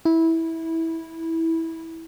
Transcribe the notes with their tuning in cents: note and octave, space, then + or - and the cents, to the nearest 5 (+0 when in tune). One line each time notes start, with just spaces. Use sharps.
E4 -15